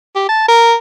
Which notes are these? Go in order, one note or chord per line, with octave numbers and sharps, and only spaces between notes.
G4
A5
A#4